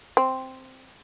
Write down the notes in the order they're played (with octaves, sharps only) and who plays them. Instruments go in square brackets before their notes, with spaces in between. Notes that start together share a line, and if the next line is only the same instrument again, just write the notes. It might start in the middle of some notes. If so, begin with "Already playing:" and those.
[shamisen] C4